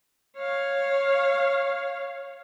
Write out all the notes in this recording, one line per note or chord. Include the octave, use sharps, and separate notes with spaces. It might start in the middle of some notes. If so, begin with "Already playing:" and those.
C#5 F5